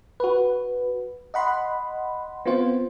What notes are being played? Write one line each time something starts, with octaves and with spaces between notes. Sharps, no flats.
F#4 B4
D#5 F#5 B5 C6
B3 C4 F4 C5